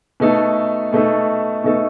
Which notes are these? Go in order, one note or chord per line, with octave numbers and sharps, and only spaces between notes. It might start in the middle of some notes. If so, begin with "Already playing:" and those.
B2 A3 D#4 A4
B2 A3 D#4 A4
B2 A3 D#4 A4